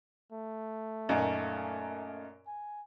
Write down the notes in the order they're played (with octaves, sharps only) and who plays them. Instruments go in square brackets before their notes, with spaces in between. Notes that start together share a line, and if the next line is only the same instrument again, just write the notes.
[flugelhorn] A3
[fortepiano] F#2 A#2 D#4
[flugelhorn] G#5